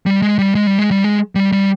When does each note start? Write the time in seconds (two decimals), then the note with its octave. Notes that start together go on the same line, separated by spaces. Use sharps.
0.06 G3
0.22 G#3
0.39 G3
0.55 G#3
0.67 G3
0.79 G#3
0.91 G3
1.04 G#3
1.35 G3
1.52 G3